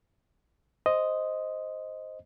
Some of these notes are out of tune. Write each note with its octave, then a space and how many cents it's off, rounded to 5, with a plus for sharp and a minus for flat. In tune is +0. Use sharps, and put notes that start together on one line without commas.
C5 +0 D#5 +0